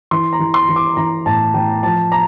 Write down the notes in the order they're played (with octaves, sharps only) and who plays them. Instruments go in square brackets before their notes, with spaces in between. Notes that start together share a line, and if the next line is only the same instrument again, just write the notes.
[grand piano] E3 C6
A#5
E3
C6
E3
D6
E3 A#5
A2 A5
E3 G5
F3 A5
A#5